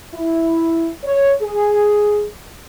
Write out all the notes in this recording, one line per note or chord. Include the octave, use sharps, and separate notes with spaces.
E4
C#5
G#4